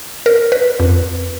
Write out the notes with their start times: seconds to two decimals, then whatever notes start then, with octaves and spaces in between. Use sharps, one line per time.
0.26 A#4
0.52 B4
0.80 F2